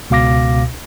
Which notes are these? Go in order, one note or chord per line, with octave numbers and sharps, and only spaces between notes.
C#2 B2 F5 D6 A#6